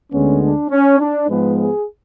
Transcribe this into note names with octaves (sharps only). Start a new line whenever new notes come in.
D2 D3 G#3 B3 C#4
D4
C#4
D4
G#2 F3 G#3 B3 B4
G#4